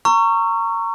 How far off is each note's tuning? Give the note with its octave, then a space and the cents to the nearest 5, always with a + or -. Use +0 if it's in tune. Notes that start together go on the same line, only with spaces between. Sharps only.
A#5 -20 C#6 +0 E6 +40